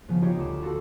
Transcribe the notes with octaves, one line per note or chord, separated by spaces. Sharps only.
C#3 F3 B3
D#4 F4 G4 C#5
D2 D6 E7
F4 F#4 A4